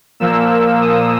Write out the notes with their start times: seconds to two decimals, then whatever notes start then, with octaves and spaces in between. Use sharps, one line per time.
0.20 A#2 F3 A#3 E6
0.82 D#6